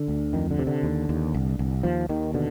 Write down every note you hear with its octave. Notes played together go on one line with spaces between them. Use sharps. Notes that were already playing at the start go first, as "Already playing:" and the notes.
Already playing: D3
D2
F2 D#3
D3
C3
D3
D#2
D#2
C2
C2
D#2 F3
D#2 D#3
B2 D3